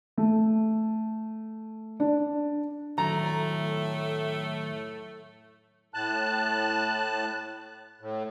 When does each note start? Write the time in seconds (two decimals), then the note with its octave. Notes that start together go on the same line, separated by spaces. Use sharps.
0.17 A3
2.00 D4
2.98 A2 D#3 F#3 A3 A#5
5.94 A2 A5 F#6
8.01 A2